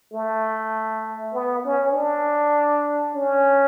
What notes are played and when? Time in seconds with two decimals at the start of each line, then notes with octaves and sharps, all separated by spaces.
0.14 A3
1.34 B3
1.65 C#4
1.94 D4
3.15 C#4